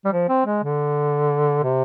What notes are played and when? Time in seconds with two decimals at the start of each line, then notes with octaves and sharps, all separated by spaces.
0.05 G3
0.13 F3
0.29 C4
0.46 G#3
0.63 D3
1.63 C3